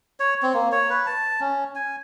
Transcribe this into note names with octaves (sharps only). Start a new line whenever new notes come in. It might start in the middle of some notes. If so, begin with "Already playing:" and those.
C#5
C4
A#3
C#5
B4
A5
C#4
G#5